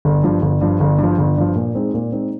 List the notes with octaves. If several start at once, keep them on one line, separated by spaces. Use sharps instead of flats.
G1
G2 F3
G1
G2 F3
G1
G2 F3
G1
G2 F3
A#2
G#3 C4 D#4
A#2
G#3 C4 D#4